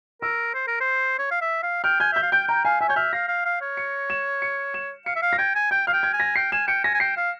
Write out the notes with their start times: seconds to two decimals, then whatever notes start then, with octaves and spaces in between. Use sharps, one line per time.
0.22 A#4 E6
0.54 C5
0.67 A#4
0.80 C5
1.19 C#5
1.31 F5
1.41 E5
1.63 F5
1.84 G5 F6
2.00 G#5 G6
2.13 E5 G6
2.22 F5
2.32 G5 G6
2.48 G5 A#5
2.65 F5 G#5
2.81 E5 G#5
2.89 C#5 G6
2.96 E5 F6
3.13 F5 A#6
3.28 F5
3.45 F5
3.62 C#5
3.77 C#7
4.10 E7
4.42 C#7
4.74 E7
5.06 F5 C#7
5.16 E5
5.22 F5
5.33 A#6
5.38 G5 G#6
5.56 G#5
5.71 G5 G6
5.87 F5 F6
5.93 G5
6.03 G#6
6.14 G#5
6.20 A#6
6.36 G5 C7
6.52 G#5 E7
6.67 G5 C#7
6.84 G#5 A#6
6.94 G#5
7.00 G5 C7
7.17 F5